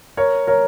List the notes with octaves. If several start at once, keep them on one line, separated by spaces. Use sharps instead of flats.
A#4 C#5
A#4 C#5